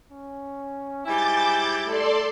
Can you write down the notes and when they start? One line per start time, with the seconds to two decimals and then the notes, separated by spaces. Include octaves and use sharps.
0.11 C#4
1.06 G#2 G3 E4 G#5 D6 G6 A6
1.85 A3 A4 D5 C6